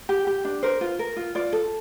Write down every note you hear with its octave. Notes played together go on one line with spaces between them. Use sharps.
G4
G4
D4
A#4 C5
F4
A#4
F4
F4 D5
A4